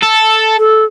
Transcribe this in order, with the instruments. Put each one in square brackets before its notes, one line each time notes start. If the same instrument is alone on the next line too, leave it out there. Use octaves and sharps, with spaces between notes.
[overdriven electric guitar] A4
[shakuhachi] A4